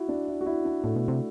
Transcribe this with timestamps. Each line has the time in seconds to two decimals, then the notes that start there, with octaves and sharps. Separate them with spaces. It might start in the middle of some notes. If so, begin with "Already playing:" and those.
Already playing: E4 F#4
0.09 D4
0.28 E4
0.41 F#4
0.46 E4
0.65 D4
0.83 A2 A3
0.96 B2
1.08 C3